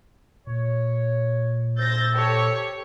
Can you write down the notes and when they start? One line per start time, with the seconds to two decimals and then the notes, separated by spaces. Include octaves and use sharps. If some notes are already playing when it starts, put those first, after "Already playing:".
0.47 A#2 C#5
1.77 D2 C5 E6 G6 A6 A#6
2.15 G4 A4 C#5